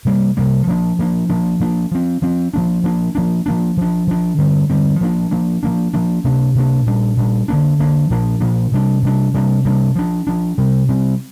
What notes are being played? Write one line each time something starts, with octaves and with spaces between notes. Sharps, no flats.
C3 G3 A#3
C3 G3 A#3
F3 A#3 D4
F3 A#3 D4
F3 A#3 D4
F3 A#3 D4
F3 C4
F3 C4
F3 A#3 D4
F3 A#3 D4
F3 A#3 D4
F3 A#3 D4
F3 D4
F3 D4
D3 G3 C4
D3 G3 C4
F3 A#3 D4
F3 A#3 D4
F3 A#3 D4
F3 A#3 D4
C3 A#3 D4
C3 A#3 D4
A#2 G3 D4
A#2 G3 D4
D3 A#3 D4
D3 A#3 D4
A#2 F3 A#3 D4
A#2 F3 A#3 D4
C3 G3 D4
C3 G3 D4
C3 G3 A#3 D4
C3 G3 A#3 D4
F3 D4
F3 D4
C3 G3 C4
C3 G3 C4